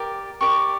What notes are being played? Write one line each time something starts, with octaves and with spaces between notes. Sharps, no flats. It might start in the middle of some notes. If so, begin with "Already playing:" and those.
Already playing: G4 A#4 D5
G4 A#4 D5 C#6